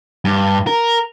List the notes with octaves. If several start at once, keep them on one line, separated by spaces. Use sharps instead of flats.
G2
A#4